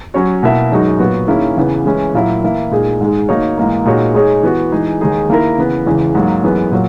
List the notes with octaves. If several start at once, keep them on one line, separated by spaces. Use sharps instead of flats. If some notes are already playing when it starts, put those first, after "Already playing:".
F#3 C#4 F#4 C#5
B2 A#3 E4 A#4 E5
F#2 D#3 G#3 D#4 F#4
A#2 F#3 B3 F#4
D#3 A#3 C#4 E4 G#4
E2 C#3 E3 B3
E3 G#3 C#4 E4
A#2 F#3 A#3 E4
E3 A#3 E4
A#2 G#3 D#4 G#4
G#2 D#3 G#3
D#3 A#3 D#4 F#4 C#5
G#2 E3 A#3 D#4
A#2 G#3 D#4 F#4 C#5
G#3 D#4 G#4 C#5
E3 B3 F#4
E3 G#3 D#4 G#4
D#2 D#3 G#3 D#4 G#4
D#3 A#3 E4 A#4
C#3 E3 B3
E2 C#3 E3 G#3
G#2 F#3 A#3
F#2 E3 G#3 B3
A#2 F#3